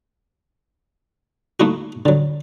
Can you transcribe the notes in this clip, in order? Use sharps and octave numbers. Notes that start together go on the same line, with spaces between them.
A3 A#3 D#4 E4 F#4
D3 F#3